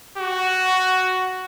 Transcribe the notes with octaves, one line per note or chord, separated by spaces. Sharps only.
F#4